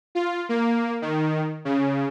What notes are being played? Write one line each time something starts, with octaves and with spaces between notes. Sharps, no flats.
F4
A#3
D#3
C#3